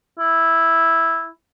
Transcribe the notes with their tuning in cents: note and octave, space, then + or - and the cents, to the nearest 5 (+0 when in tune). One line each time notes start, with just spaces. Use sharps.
E4 +0